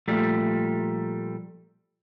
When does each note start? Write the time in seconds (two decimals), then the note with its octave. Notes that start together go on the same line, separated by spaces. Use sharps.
0.08 A#2 F3 G3 A3